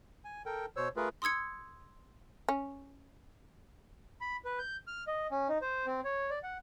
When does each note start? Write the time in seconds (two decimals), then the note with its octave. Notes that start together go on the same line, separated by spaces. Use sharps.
0.24 G#5
0.46 A4 A#4 G5
0.76 B2 C5 C#5 E6
0.96 A3 F4 G#4 A#4 B4
1.22 C6 D#6 E6 G#6 C#7
2.49 C#4
4.21 B5
4.45 B4
4.59 G6
4.87 F6
5.07 D#5
5.31 C#4
5.49 D#4
5.62 C5
5.87 C4
6.05 C#5
6.30 D5
6.43 F#5